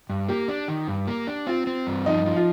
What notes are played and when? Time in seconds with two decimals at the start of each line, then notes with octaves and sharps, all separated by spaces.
0.10 G2
0.28 A#3 G4
0.48 D4
0.68 D#3
0.88 G2
1.08 A#3
1.27 D4
1.47 C4 F4
1.67 C4
1.87 G2
2.06 F3 D#4
2.26 F3
2.36 F4